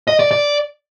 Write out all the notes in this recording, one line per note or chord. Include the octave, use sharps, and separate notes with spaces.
D#5
D5
D5